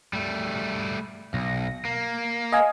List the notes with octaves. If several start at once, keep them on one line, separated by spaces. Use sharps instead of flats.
G3 A3
B1 A#6
A#3
D#5 F5 G#5